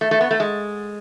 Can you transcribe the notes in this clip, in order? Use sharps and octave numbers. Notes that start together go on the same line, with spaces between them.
A3
A3
B3
A3
G#3